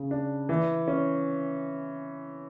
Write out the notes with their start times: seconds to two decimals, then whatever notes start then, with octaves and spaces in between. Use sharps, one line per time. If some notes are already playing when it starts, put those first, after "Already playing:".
Already playing: C#3
0.11 D4
0.49 E3
0.88 C#4